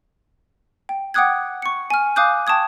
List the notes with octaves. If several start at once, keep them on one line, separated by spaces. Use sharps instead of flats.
G5
F#5 G5 D6 D#6 F#6 G#6
C#6 C#7
G#5 F6
F5 G#5 D6 D#6 F#6 G6
G5 A5 C#6 D#6 G#6